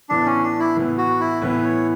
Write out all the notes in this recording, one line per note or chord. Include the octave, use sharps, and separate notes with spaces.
A2 E3 B3 D4
C#4
D4
E4
A2 E3 B3
F#4
E4
A2 E3 B3 B4
C#5